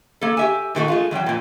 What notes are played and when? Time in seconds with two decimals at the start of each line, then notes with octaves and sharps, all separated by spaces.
0.21 A#3 A4
0.37 G4 E5 G#5
0.75 A#2 D#3 A3 F#4
0.88 G#3 A3 F4
1.11 E2 B2 F#3 G5
1.26 F2 A#2